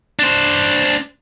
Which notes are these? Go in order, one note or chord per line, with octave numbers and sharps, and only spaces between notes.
D4 C5